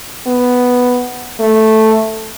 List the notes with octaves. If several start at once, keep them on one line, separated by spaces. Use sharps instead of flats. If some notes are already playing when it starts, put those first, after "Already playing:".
B3
A3